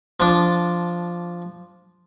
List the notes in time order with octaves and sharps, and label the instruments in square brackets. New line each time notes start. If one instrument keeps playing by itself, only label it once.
[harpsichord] F3 D4